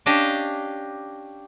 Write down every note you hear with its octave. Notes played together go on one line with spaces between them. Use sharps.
C#4 D4 G4 D#5 F5 A5